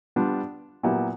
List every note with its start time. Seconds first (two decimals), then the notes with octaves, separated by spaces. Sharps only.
0.16 G3 B3 D4 F4
0.83 A#2 F#3 B3 E4 G4